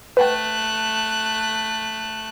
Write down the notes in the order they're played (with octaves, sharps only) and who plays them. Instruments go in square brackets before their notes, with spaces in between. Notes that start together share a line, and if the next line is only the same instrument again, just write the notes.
[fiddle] A3 F#6 [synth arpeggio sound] B4 F#5 G5